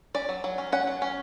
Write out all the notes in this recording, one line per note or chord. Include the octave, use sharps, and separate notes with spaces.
C#4 D5
F#3
F#3
C#4
C#4 F#5
F#3
C#4